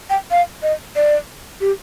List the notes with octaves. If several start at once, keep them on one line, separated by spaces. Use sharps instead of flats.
G5
F5
D#5
D5
G4